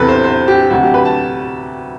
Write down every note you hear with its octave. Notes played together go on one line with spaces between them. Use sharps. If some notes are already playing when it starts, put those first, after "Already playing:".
Already playing: E2 C3 E3 A4 B4
C5
C5
G4
D2 C3 F#3 F#4
G4
B4
A5